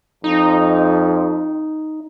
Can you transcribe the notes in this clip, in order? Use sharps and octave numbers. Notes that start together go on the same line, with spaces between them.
F2 D#4